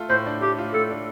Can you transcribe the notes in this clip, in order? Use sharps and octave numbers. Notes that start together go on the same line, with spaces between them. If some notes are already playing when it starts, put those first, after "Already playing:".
Already playing: A3 F4
A2 C5
D4
A3 G4
F4
A2 A4
D4